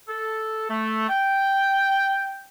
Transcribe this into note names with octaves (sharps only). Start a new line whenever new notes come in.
A4
A3
G5